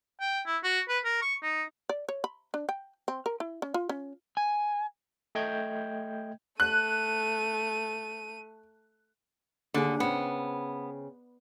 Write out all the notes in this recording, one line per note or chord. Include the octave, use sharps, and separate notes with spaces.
G5
E4
F#4
B4
A#4
C#6
D#4
D5
C#5
B5
D4
G5
C4
A#4
E4
C#4
F4
C#4
G#5
A3 D#5 G5 G6 G#6
A3 F#6 D#7
D#2 D3 G#4
C#3 B3 C4